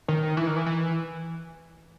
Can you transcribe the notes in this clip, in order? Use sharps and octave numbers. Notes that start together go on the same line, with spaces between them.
D#3
E3
D#3
E3
E3